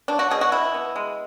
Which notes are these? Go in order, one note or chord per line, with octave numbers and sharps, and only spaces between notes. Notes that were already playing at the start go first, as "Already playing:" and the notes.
F#3 D4
F#4
B2 G#4
F#4
B2 E4
B3
G#3